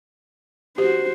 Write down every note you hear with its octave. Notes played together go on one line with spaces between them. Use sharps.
F#4 G4 C5